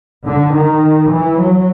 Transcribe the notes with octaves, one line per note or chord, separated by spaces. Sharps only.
D3
D#3
E3
F#3